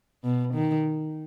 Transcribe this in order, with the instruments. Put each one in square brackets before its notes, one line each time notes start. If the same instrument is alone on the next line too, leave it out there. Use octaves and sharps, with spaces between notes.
[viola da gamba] B2
D#3